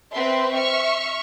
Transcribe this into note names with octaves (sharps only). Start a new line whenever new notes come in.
C4 B4 E5 C6
E5 C#6 F6